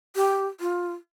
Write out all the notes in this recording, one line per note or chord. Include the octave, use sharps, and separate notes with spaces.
G4
F4